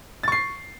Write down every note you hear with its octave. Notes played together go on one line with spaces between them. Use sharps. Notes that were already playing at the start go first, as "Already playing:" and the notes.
C#6 A6 C7